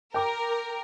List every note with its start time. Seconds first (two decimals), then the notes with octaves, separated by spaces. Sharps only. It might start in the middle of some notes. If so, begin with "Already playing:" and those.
0.14 A#4 G5 D6